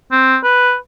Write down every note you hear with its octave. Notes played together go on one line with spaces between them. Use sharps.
C4
B4